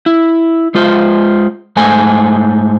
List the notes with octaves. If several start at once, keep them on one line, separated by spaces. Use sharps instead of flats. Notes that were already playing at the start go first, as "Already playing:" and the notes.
E4
G#3 F4 C5
G#2 A3 C5 G#5